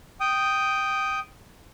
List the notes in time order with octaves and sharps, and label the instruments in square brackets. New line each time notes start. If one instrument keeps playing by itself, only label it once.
[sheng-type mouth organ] G5 D#6